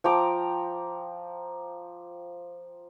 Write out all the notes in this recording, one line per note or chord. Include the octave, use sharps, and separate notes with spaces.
F3 G5 A#5 D6